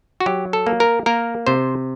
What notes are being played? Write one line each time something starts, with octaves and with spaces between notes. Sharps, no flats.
F#4
F#3 G4
A4
A#3
A#4
A#3 A#4
C3 C5